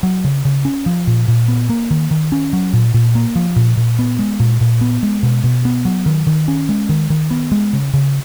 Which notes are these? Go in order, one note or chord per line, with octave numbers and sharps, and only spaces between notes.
F#3
C#3
C#3
C#4
F3
A#2
A#2
B3
A#3
D#3
D#3
C#4
F#3
A#2
A#2
A#3
F3
A#2
A#2
B3
G#3
A#2
A#2
B3
G#3
B2
B2
B3
F#3
D#3
D#3
C#4
G#3
D#3
D#3
B3
G#3
C#3
C#3